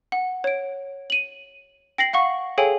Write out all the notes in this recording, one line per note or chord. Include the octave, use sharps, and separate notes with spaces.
F#5
C#5 D7
D#7 F#7
G5 A#6 C7 F#7
F5 F#5 C#6
G#4 A4 C#5 F5 G5 G#5